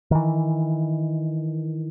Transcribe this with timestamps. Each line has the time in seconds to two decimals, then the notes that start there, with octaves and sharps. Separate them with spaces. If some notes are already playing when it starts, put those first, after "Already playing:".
0.11 D#3 E3